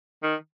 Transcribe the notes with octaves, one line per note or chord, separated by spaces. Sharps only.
D#3